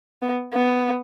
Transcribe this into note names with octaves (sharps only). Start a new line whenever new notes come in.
B3
B3